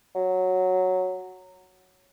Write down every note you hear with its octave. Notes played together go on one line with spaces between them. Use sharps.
F#3